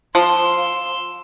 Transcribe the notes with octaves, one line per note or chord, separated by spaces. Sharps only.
F3 C6 E6